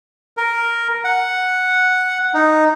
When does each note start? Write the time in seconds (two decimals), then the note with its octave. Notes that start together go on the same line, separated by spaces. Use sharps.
0.37 A#4
1.04 F#5
2.34 D#4